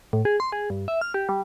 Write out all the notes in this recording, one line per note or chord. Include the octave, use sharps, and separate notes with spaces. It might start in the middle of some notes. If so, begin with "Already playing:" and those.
A2
G#4
C6
G#4
G2
E5
F6
G4
G3